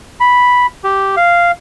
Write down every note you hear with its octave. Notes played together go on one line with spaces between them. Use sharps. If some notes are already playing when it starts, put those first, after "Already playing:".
B5
G4
F5